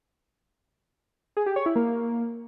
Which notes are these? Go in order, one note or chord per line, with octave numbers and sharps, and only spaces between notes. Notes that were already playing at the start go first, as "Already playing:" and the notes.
G#4
G4
C#5
E4
A#3